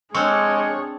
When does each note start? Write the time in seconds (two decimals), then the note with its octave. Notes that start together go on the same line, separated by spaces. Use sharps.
0.15 G#3 C4 D4 G#4 C#5 C#6 F6 F#6